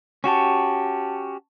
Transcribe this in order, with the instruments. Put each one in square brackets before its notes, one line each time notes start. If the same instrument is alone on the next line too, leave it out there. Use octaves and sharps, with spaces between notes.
[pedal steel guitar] C#4 F#4 G4 [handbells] A5 C#6